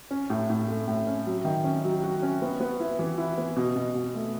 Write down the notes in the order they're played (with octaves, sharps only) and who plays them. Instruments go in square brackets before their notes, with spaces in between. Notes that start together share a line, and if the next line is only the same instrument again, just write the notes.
[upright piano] C#4
A2
A2
A3
A2
C#4
F#3
D#3
C#4
F#3
F#4
C#4
B3
B3
E4
E3
E4
B3
B2
B2
B2
A3